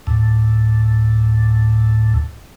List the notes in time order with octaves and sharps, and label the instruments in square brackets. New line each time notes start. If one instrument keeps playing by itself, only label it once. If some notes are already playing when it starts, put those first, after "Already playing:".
[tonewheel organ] D2 A2